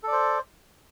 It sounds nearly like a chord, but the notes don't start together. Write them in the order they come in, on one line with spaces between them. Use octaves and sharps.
A4 D5 C5